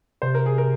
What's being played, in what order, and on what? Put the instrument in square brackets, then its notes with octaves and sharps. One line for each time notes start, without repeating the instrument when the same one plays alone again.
[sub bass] C3 [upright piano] C5
[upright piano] A#4
G#4
A#4